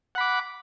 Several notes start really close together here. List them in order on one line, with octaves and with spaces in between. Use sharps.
F#5 B5 D6